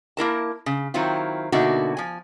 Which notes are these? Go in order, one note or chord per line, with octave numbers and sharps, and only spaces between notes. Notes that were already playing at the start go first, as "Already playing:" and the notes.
A#3 E4 A#4 A5
C#3
D#3 F#3 C4 E4 F4
B2 D3 A#3 D#4 F#4 E5
F3 G#5